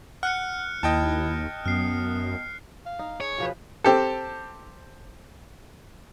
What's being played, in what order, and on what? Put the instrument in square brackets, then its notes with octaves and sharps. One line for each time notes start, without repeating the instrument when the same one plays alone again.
[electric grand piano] F#5 [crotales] F6 F#6 C#7
[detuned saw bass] D#2 [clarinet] E4 [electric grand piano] D#5 G5 A5
[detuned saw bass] F#2 [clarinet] B3 [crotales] F6 C7
[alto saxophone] F5
[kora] D#4
[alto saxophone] G#4 [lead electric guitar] C#5
[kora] B2 F3 B4 [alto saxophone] G#4
[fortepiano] C4 G4 A4